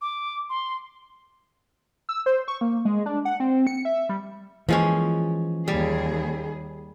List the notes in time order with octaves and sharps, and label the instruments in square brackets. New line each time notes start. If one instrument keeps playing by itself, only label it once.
[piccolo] D6
C6
[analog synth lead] E6
C5
C#6
A#3
G#3
D4
F#5
C4
C#7
E5
G3
[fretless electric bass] E3 A#3 [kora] F3 G#3 C#4
[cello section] D#2 G#4 [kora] G3